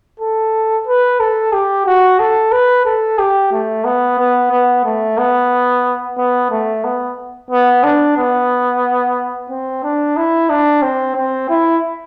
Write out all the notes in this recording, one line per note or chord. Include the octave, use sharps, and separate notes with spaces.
A4
B4
A4
G4
F#4
A4
B4
A4
G4
A3
B3
B3
B3
A3
B3
B3
A3
B3
B3
D4
B3
C4
D4
E4
D4
C4
C4
E4